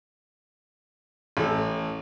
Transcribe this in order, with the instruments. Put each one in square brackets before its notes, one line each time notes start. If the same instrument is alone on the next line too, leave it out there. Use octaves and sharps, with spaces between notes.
[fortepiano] A1 A4